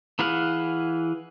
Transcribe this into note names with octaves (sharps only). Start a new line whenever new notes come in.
E3 E4 G#4 F5 F#5